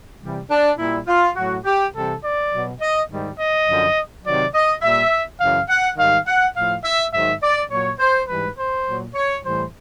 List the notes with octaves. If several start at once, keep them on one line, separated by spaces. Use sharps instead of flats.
C3 E3 G3
D4
A#2 G3 E4
F4
A2 F#3 F#4
G4
C3 E3 G3 A4
D5
B2 F#3
D#5
G#2 D#3 G3
D#5
F#2 D3 F3
C3 D#3 F#3 D5
D#5
A#2 G3 E5
F#2 C#3 E3 F5
F#5
G#2 D#3 G3 F5
F#5
A2 F3 F5
E5
G#2 D#3 F#3 E5
D5
A#2 F#3 C#5
C5
G#2 E3 G3 B4
C5
A#2 F#3
C#5
A2 E3 G3 C5